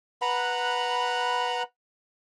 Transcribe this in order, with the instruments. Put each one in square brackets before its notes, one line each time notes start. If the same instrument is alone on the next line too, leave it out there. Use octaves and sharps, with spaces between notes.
[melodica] B4 F#5 A#5 B5